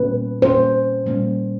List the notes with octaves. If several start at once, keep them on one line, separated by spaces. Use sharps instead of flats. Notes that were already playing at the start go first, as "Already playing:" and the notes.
Already playing: A#2 G3 A#3 C#4 B4
A#2 G3 A#3 C#4 C5
A#2 G3 A#3 C#4